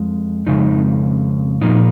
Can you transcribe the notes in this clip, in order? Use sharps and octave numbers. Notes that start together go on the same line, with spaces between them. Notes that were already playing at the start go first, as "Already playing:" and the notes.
Already playing: F2 G#3
F2 C#3 G#3 D#4
A#2 F3 A#3 D#4